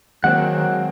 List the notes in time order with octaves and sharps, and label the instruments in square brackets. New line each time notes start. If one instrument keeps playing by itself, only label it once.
[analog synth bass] D#3 [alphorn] F#3 [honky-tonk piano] G#3 A#3 C4 [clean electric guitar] F#5